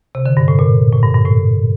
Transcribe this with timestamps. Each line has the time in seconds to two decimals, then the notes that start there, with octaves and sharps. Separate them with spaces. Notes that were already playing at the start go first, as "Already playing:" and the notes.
0.15 C3
0.26 D3
0.37 G2
0.48 A2
0.59 A#2
0.92 A2
1.03 G2
1.15 G2
1.26 A2